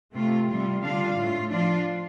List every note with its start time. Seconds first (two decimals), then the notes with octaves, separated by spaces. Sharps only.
0.14 C3 A3 C4 F4
0.48 C3 G3 F4
0.82 D3 G3 D4 F4 F5
1.16 A2 A3 F4
1.50 F3 D4 F4